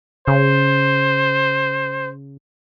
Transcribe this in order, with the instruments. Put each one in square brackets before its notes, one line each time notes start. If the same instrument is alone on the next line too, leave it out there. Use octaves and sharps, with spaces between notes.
[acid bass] C#3 [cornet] C5